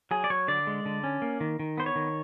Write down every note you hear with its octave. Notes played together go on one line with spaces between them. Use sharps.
F#3 G#4
D5
F#3 C#5
D3 D5
G#3
D3
C#4
A#3
D#3
D#3
B3 C5
C#5
D#3